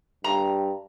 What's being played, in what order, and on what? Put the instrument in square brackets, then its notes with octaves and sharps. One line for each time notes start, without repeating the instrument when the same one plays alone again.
[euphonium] G2 [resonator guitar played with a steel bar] A#5